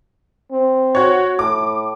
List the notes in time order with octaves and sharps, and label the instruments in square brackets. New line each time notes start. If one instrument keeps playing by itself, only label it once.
[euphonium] C4
[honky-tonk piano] F#4 C#5
[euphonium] A2 [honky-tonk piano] D6